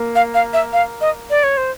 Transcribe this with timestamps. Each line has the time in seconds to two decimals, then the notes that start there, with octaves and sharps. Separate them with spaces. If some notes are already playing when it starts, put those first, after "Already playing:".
Already playing: A#3
0.15 F5
0.34 F5
0.53 E5
0.73 F5
1.01 D#5
1.30 D5
1.43 C#5
1.57 C5